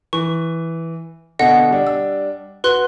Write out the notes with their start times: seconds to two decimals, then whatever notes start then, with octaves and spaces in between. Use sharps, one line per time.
0.13 E3 C#6
1.39 B2 D3 D#5 F#5
1.71 G3 D4
1.87 E6
2.64 F#4 B4 C6 F#6